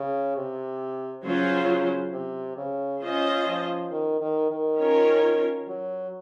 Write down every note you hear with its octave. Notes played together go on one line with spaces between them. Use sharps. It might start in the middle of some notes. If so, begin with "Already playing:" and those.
Already playing: C#3
C3
C#3 F#3 C#4 F4 C5
C3
C#3
C#4 F4 C5 D#5
F3
D#3
D#3
D#3
C#4 F4 A#4 C#5
F#3